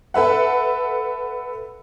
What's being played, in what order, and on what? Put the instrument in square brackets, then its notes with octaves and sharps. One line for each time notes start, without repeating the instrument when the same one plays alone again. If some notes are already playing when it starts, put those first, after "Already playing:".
[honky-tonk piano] A4 B4 E5 F#5